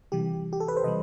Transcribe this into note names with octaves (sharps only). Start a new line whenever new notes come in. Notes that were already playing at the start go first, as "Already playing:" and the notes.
C3 E3 G3 G4
G4
A4
B4
C5
C3 E3 G3 D#5